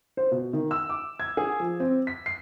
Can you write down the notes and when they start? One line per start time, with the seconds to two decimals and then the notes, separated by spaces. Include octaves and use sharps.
0.17 C5
0.31 B2
0.53 D#3
0.71 E6
0.89 D6
1.20 G#6
1.37 G#4
1.60 F3
1.80 C4
2.07 B6
2.26 C7